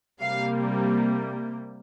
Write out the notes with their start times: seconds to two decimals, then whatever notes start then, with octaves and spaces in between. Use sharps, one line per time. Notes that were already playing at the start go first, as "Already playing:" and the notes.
0.21 C3 G3 A#3 F5